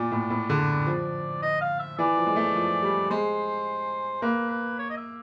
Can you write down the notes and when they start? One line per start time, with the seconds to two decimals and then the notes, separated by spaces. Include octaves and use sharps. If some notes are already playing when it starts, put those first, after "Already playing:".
Already playing: A#2 D5
0.11 A2
0.30 A2
0.49 D3
0.87 F3
1.42 D#5
1.61 F5
1.79 E5
1.98 E3 D5
2.17 F3
2.26 G#3
2.36 A3
2.55 F3
2.82 G3
3.10 G#3 C5
4.22 A#3 B4
4.50 B4
4.78 C#5
4.90 D#5
4.97 E5